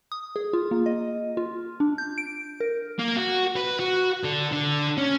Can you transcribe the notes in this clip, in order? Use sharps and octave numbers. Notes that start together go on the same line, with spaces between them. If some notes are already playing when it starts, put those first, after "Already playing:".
D#6
G#4
F4
A#3
D#5
F4
D4
G6
D7
A#4
A#3
F#4
B4
F#4
D3
D3
C#4